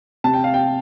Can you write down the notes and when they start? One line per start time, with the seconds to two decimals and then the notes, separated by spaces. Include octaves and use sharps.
0.24 C3 A5
0.33 G5
0.44 F5
0.54 G5